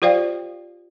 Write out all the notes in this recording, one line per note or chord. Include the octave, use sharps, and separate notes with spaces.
F4 G4 C5 D5 F5 G5